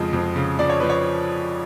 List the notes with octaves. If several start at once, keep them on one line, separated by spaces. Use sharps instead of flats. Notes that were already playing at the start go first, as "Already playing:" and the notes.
Already playing: F2 C#3 F3 G#3
F2
C#3
F3 D5
C#5
F3 B4
C#5